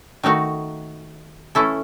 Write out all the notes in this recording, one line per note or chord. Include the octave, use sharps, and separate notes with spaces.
D#3 A3 D#4 F#4
E3 A3 C#4 E4 A4